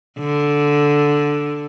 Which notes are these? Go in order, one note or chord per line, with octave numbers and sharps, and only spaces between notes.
D3